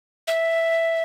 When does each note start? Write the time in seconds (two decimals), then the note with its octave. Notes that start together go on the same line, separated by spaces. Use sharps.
0.28 E5